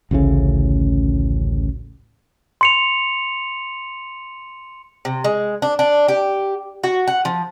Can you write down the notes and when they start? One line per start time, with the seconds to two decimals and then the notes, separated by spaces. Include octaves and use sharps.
0.11 A1 D2 A2 C#3
2.61 C6 C#7 F7
5.05 C3
5.24 G#3
5.62 D4
5.79 D4
6.08 G4
6.84 F#4
7.08 F#5
7.25 F3